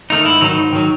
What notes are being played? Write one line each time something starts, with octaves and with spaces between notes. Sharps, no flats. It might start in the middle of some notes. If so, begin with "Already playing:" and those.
D#3 A3 D#4
G#2 E4
D#3 F#3 D#4
G#2
D#3 F#3